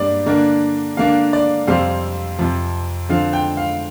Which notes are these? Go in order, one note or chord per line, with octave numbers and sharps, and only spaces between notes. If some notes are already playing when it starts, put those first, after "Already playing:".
Already playing: G2 G3 A#3 D5
D3 A#3 D4
D3 A#3 D4 F5
D5
F2 C3 G3 C4 F5
F2 C3 F3
D3 F3 C4 F5
G5
F5